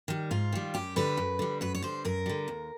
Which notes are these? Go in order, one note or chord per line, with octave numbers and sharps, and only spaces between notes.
D#3 G3
G#2 F4
D#3 G3
F#2 G4
D3 G3 B4
F#2
D3 G3
F#2 B4
C#5
D3 G3 C5
F#2 A#4
D3 G3
D#2